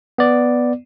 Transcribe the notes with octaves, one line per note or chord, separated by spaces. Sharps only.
B3 D5